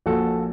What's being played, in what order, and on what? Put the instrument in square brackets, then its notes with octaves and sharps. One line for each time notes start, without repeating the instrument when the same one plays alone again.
[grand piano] A#1 A#2 F#4 A4